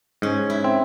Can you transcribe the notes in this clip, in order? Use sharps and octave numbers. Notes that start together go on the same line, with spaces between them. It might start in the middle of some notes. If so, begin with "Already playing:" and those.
G#2 C#4
E4
C4